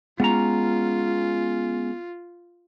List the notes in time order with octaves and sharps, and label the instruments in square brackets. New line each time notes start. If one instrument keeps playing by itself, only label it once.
[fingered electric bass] G#3 [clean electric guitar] B3 C#4 A#5 [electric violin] F4